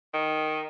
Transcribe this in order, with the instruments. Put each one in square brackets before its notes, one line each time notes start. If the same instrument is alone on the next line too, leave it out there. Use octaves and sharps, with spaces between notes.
[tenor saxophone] D#3